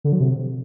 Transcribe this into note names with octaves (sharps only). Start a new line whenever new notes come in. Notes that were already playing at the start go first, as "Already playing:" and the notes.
D3
F#3
C3